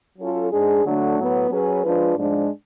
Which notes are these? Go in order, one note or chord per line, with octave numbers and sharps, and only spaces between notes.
F#3 C#4 F4 A4
G#2 G#3 D4 G#4
D3 F#3 A3 D4 F#4
A2 F#3 B3
F#3 C#4 G#4 B4
F3 G#3 D4 F4 B4
G#2 F3 G#3 D4